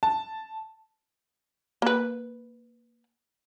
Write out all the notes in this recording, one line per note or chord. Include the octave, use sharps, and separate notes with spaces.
A5
A#3 B4